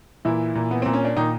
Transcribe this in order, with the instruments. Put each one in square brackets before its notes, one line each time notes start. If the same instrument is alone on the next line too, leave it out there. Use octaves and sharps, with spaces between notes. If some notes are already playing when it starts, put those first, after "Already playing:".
[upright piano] A#2 E3 E4
A#2
B3
A#2 C4
C#4
D4
A#2 D#3 D#4